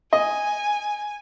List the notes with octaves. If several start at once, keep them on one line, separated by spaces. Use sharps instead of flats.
D#5 G#5